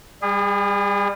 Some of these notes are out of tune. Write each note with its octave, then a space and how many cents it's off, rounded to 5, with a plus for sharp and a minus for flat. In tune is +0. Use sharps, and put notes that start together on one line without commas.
G3 +25 G#4 -30